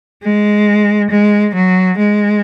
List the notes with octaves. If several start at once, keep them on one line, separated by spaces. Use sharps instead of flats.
G#3
G#3
F#3
G#3